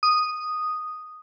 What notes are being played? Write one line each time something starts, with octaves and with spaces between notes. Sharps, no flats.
D#6